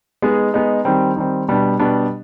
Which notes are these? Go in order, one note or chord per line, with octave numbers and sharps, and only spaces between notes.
G#3 B3 D#4 G#4
G#3 B3 D#4 G#4
D#3 G3 C4
D#3 G3 C4
B2 G3 B3 D4
B2 G3 B3 D4